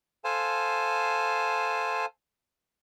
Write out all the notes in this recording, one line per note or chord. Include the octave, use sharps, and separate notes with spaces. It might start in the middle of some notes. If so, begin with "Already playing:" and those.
A4 C5 F5 G#5 A5